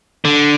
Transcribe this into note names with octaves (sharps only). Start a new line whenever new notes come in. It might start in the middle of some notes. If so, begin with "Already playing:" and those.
D3